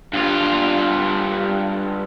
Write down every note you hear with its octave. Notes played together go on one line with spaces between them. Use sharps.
G2 F4